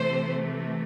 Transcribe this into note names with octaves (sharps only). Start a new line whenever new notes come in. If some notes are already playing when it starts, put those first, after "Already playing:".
Already playing: C3 E3 A3 C5